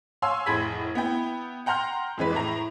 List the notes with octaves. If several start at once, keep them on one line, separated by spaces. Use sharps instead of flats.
C#5 F5 G#5 C6 E6
F1 A2 G#4 B5 G#6 B6
B3 E4 G5
F#5 G5 A#5 C6 F6 G6
F2 E3 G#3 B4
A2 E4 A#5